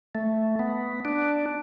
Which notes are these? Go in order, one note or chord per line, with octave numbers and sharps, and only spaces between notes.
A3
B3
D4